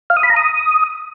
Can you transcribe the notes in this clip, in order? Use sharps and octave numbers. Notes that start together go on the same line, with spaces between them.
F5
D#6
B5
A#5
D#6